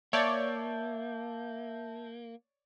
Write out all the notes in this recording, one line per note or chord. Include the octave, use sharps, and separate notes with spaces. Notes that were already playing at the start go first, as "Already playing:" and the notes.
A#3 C#5 D5 E5 A5 G6